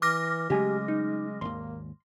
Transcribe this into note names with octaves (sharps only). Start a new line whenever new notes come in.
E3 D6 F6 A#6
C#3 F#3 G#3 A3 G4 G#5
D#4
G#1 D#2 A#3 C6